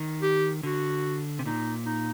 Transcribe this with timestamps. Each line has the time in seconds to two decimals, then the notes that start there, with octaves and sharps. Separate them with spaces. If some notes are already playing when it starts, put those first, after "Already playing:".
Already playing: D#3
0.22 G4
0.63 D3 F#4
1.39 C3
1.46 A#2 D#4
1.86 D#4